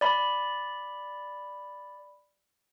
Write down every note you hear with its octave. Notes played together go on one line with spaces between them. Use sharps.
D5 B5